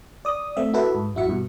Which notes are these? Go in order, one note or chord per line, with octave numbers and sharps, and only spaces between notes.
D5 D#6
A3 C4 E5
E4 F#4 A4 B4 E5
G#2
A1 F#2 E4 F#4 E5 C#7
G2 B2